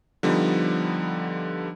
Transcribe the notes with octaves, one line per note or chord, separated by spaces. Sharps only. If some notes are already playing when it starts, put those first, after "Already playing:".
D3 F3 G3 B3 D#4